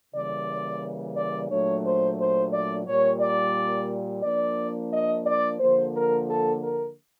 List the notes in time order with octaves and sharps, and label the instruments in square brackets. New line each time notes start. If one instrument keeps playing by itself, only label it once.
[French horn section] C#3 E3 G3 A#3 D5
D5
A#2 F#3 A3 D4 C#5
C5
C5
D5
A#2 G3 A#3 C#5
D5
F3 A#3 D4 D5
D#5
D5
D3 F3 A#3 C5
A#4
A4
A#4